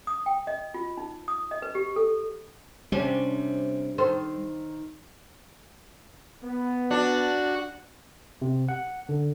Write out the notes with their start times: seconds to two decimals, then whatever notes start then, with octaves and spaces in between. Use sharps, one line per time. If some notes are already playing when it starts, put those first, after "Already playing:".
0.07 D#6
0.26 G5
0.47 D#5
0.74 F4
0.97 D#4
1.28 D#6
1.51 D#5
1.62 B4
1.75 G4
1.96 A4
2.92 C3 G3 C#4 D4
3.98 D#3 A4 C5
6.44 B3
6.91 D4 F#4
8.42 C3
8.69 F#5
9.09 D3